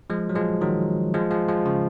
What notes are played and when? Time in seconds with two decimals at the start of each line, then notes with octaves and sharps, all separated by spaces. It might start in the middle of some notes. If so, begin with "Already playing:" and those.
0.10 F3 G#3
0.29 F#3
0.36 F3 G#3
0.61 D#3 F#3
1.14 F3 G#3
1.31 F3 G#3
1.48 F3 G#3
1.65 C#3 F3